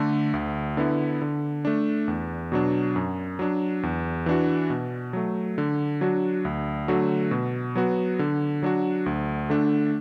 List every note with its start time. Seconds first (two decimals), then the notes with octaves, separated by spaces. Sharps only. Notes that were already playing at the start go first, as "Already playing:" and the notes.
Already playing: D3 A3
0.34 D2
0.77 D3 B3 E4
1.21 D3
1.65 A3 D4
2.08 E2
2.52 B2 F#3 D4
2.96 F#2
3.39 F#3 D4
3.83 E2
4.26 E3 D4 F#4
4.70 B2
5.13 F#3 A3
5.58 D3
6.01 F#3 D4 F#4
6.45 D2
6.88 D3 F#3 A3 F#4
7.31 B2
7.75 F#3 B3 F#4
8.19 D3
8.63 F#3 D4 F#4
9.06 D2
9.50 D3 A3 D4